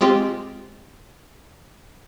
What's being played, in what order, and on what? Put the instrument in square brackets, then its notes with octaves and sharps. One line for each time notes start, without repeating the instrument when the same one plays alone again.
[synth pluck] G#3 C4 F4 G4